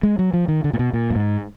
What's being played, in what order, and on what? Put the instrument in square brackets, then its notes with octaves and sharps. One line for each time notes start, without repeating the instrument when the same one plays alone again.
[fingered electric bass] G#3
F#3
F3
D#3
D3
A#2
B2
A#2
F#2
G#2